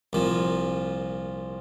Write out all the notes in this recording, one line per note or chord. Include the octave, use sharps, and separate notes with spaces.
C2 A#2 F3